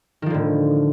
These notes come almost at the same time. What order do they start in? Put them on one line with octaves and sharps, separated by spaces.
D#3 F3 D3 A2